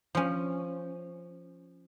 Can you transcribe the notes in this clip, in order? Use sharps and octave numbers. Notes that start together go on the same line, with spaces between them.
F3 C#4